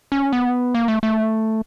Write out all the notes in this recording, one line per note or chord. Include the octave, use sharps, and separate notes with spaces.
C#4
B3
A#3
A3
A3